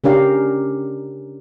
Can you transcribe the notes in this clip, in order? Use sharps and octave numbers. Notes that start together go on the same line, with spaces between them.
C#3 C#4 D4 G4 A#4 F5